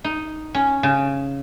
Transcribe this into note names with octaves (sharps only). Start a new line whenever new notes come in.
D#4
C#4
C#3